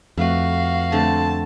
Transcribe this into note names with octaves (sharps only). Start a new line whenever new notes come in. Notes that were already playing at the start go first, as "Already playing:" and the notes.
F2 A3 F#4 B4 F5
D3 A3 C4 A5